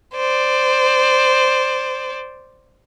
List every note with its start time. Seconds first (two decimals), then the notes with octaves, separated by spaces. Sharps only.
0.15 C5 D5